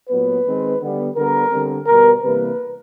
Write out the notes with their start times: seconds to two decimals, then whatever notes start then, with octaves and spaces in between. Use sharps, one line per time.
0.10 A#2 F#3 B3 B4
0.46 D#3 G#3 C4
0.81 D3 G3 B3
1.16 D3 G3 B3 A#4
1.51 D3 G3 C4
1.86 B2 G3 B3 A#4
2.22 C3 E3 G3 A#3 B4